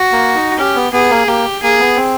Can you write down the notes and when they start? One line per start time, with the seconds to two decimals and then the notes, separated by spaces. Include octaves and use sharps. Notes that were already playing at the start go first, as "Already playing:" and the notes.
Already playing: F#4
0.12 A#3
0.35 D#4
0.59 C#4 G4
0.76 B3
0.93 B3 G#4
1.11 A#3
1.27 A#3 G4
1.63 A#3 G#4
1.80 B3
1.97 C4